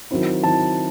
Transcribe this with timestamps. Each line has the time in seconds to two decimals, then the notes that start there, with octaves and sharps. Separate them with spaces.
0.11 D#3 F#3 C4 E4
0.44 D#3 F#3 C4 E4 A5